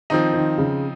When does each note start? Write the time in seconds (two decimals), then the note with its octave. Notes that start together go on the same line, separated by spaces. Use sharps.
0.10 D#3 F3 C4 D#4
0.34 D#3
0.58 C#3